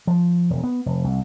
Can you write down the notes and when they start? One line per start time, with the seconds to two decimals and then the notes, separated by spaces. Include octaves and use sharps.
0.07 F3
0.50 E1
0.63 B3
0.86 F1
1.04 C2